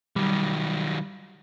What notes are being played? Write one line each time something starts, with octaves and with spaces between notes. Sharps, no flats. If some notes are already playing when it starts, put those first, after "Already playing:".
D#3 F#3 G3